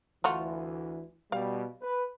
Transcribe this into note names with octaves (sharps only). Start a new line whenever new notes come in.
D2 E3 A3 F4 F#4
B2 G3 F5
B4